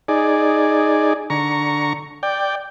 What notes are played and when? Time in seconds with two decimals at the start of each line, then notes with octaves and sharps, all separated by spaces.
0.08 D#4 G#4 D5
1.30 D3 A#5 C#6
2.23 D5 G5